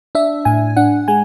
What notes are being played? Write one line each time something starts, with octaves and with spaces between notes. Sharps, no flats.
D4 E5
A2 G#5
D4 F#5
G#3 G#5